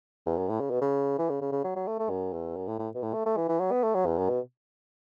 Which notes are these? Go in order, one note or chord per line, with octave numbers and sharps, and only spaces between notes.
E2
F#2
A2
C#3
B2
C#3
E3
C#3
C#3
C#3
F#3
F#3
A3
A3
F#2
E2
F#2
A2
A2
B2
A2
A3
A3
E3
E3
F#3
B3
A3
F#3
E2
F#2
B2